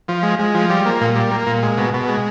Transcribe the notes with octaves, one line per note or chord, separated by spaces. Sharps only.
F3
G#3
G#3
F3
G3
A#3
A#2
G3
A#3
A#2
G#3
B2
B2
G#3